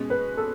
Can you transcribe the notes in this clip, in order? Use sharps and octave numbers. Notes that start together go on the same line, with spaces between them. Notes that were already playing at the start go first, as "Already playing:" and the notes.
Already playing: B2 G#3 C#4
B4
A4